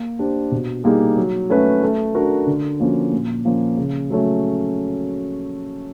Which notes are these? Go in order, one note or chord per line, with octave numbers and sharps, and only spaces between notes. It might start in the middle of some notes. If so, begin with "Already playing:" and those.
Already playing: A#3
D4 G4 C5
B2
G3 A#3 D#4 G#4
F#3
A3 C#4 F#4 B4
A3
D4 F#4 A#4
D3
F3 A#3 C#4 F#4
A#2
F3 A#3 C#4
C#3
F#3 A3 C#4